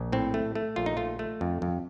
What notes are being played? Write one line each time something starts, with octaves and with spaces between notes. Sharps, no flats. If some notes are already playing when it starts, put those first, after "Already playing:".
Already playing: A#1
A2 C4
A3
A3
A#1 F4
D#4
A3 F4
A3
F2
F2